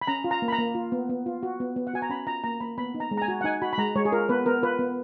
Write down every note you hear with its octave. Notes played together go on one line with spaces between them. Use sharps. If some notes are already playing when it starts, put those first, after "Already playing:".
B5
C#4 A#5
F4
A#5
A#3
B5
A#5
A#3
F4
B3
B3
F4
F#4
B3
B3
F#5
F#4 G#5
A#5
C#4 B5
F4 A#5
A#3 A#5
A#3 B5
B3 B5
D#4
A#5
G#3
A#5
G#5
F#4
F#5
D#4 G#5
F#4 B5
B5
G#3 A#5
G#3 C#5
G#4
F4 A#4
B3 B4
B3 A#4
F4 B4
B3